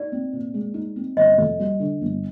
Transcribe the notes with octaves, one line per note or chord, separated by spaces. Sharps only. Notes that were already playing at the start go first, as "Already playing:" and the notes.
Already playing: D#4 D5
C4
A#2
G#3
D#4
C4
G1 D#5
F2
G3
D3
G1